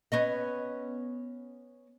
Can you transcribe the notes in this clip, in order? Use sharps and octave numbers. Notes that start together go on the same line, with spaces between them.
B3 C#4 D#5